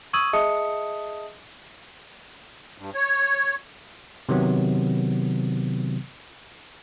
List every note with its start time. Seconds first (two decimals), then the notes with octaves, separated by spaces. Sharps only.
0.13 C#6 D#6 E6 G#6 D#7 F#7
0.33 G#4 D#5 E5 A5 D#6 C#7
2.78 G2
2.95 C#5
4.29 C3 D#3 F#3 B3